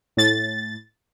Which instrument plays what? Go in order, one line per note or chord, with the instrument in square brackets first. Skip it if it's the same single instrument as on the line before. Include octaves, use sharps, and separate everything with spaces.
[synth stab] A2 A6